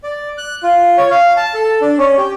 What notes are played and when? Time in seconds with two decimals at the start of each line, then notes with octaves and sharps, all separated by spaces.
0.04 D5
0.38 F#6
0.63 F4
0.98 C#5
1.11 F5
1.37 A5
1.54 A4
1.81 D4
1.98 C#4
2.17 G4